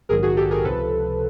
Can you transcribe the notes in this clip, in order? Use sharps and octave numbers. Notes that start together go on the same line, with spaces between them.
A#1 G#2 D#3 F#3 G#4 A#4
F#4 G#4
G4 A4
G#4 A#4
C#2 C3 F3 A4 B4